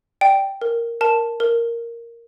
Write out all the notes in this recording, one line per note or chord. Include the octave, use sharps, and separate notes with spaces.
D5 G5
A#4
A#4 A5
A#4